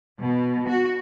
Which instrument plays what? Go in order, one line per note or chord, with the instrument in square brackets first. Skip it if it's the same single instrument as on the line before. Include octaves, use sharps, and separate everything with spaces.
[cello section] B2
F#4